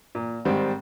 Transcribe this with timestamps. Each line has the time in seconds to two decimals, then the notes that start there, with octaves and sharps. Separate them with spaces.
0.15 A#2
0.45 G#2 D#3 G3 C4